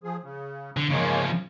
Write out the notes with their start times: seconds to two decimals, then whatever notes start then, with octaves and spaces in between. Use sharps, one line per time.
0.04 F3 G#4
0.22 C#3
0.77 D3
0.90 C#3 F3 G#3 A#3 C#5